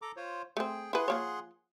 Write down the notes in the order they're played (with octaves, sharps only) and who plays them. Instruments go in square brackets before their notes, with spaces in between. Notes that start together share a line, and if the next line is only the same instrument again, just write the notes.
[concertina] A4 A#5 D6
F4 C5 C#5
[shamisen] A3 C4 [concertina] G#4 G5
[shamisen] E4 B4 [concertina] G#4 F#5 C6
[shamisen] F3 A#3 C#5